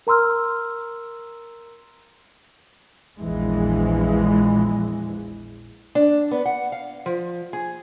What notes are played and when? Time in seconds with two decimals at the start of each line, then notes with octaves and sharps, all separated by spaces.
0.07 A#4 A#5 C6 E6 F6
3.19 A#1 E2 E3 F3 G#3
5.95 D4
6.31 B3
6.45 F#5
6.72 F5
7.06 F3
7.53 G#4